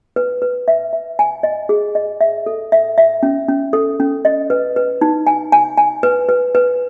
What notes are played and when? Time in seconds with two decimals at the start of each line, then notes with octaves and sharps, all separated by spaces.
0.16 B4
0.42 B4
0.68 E5
0.93 E5
1.19 G#5
1.43 D#5
1.69 G#4
1.95 D#5
2.21 E5
2.46 A4
2.72 E5
2.98 E5
3.23 C#4
3.49 C#4
3.73 A4
4.00 C#4
4.25 D#5
4.50 B4
4.76 B4
5.01 D#4
5.27 G#5
5.52 G#5
5.77 G#5
6.03 B4
6.29 B4
6.55 B4